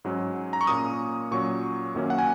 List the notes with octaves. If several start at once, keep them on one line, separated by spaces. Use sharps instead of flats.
G#2 F#3 C#4
A#5
C#6
A#2 A#3 C#4 D#6
A#2 F#3 C#4 C#6
F#2 D#3 F#3 A#3 C#4
F#5
G#5